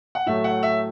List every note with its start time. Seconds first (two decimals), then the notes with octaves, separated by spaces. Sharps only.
0.15 F#5
0.26 A2 F#3 A3 E5
0.44 F#5
0.63 E5